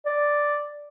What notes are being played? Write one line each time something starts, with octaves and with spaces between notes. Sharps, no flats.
D5